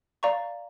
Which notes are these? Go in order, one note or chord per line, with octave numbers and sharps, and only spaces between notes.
D5 F5 A#5 C#6